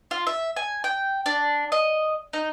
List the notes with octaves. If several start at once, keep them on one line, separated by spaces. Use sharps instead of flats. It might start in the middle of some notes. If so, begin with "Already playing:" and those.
F4
E5
G#5
G5
D4
D#5
D#4